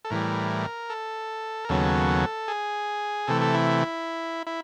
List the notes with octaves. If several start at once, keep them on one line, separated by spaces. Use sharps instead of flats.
A4
A2 E3 G3 A#4
A4
A#4
D#2 C#3 F#3 B3 A4
G#4
C3 E3 A3 A4
A4
E4
E4